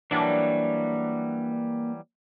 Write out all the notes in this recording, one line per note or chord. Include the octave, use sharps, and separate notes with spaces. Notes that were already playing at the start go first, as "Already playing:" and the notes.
E3 F#3 G3 A#3 D4